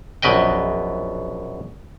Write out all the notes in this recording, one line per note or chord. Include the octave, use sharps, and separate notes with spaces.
A#1 F#2 B2 B4 D#5 G5